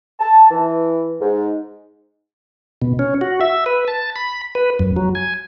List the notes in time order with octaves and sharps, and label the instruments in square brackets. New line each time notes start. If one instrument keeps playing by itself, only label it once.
[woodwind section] A5
E3
G#2
[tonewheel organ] B2
C#4
F#4
E5
B4
A5
B5
B4
F#2
F#3
G#5